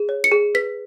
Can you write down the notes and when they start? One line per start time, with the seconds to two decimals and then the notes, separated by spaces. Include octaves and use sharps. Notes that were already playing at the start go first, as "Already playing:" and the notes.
Already playing: G#4
0.09 C#5
0.24 C#7
0.32 G#4
0.55 B4 B6